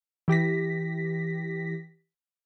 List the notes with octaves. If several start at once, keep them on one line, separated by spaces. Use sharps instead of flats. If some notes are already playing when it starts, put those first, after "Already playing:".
E3 G4 A#6 B6